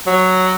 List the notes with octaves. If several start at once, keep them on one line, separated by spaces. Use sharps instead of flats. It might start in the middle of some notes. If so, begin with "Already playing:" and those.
F#3